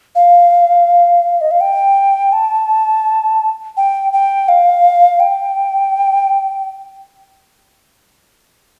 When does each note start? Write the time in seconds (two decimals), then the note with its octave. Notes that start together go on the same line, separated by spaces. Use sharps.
0.15 F5
1.41 D#5
1.51 F5
1.61 G5
2.32 A5
3.77 G5
4.13 G5
4.48 F5
5.20 G5